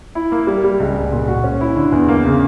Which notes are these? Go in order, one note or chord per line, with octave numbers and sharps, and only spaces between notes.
E4
A#3
G3
G3
C#2
C#2
A#2
F#4
C#4
E4
D3
E2
A#3
C#3